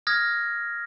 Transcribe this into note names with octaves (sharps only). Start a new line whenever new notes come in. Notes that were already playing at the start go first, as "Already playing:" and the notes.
D#6 F6 G#6 A#6